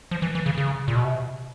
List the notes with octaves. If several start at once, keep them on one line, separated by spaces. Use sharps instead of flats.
F3
E3
E3
C#3
C#3
A#2
B2
C3